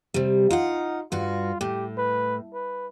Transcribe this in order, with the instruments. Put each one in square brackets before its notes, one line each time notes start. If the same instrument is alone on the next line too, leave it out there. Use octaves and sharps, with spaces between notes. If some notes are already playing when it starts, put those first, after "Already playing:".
[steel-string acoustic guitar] C3 G3
[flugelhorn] D#4 [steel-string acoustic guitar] F4 F#5
[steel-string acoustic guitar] G2 F#4 [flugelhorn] F4
[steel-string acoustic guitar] A2 [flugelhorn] G4
[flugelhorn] B4
B4